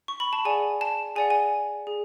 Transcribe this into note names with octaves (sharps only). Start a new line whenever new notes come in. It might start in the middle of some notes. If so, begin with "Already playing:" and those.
C#6
B5
A5
G#4 D5 F#5 G#5
A5
G#4 D5 F#5 G#5
G#5
G#4